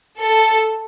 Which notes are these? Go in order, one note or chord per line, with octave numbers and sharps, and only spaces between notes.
A4